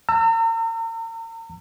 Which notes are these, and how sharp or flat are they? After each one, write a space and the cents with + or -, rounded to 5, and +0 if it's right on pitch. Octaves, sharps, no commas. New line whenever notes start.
A#5 -40 E6 +25